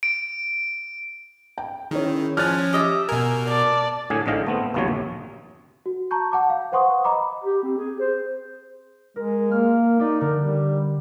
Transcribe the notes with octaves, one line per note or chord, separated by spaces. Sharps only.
D7
G5
D#3 C#4 E4 G#4
F3 C#4 F6 F#6 A6
G4 D#5 E5
B2 A#4 G#5
D5 A5
A2 D3 G#4 G#5
A1 G#2 D3 D#5 F5 G5
A3 B3 C4
G1 D#2 C3 F3 F#3 C#5
A#1
F#4
A5 A#5 C#6 G6
F#5 A5 D6
F5
B4 C5 F#5 C6 C#6 D#6
D#5 A#5 B5 D6
G4
C4
G#4
C5
G#3 A#4
A#3 F6
D#4 G4 D5
D3 A#4
G3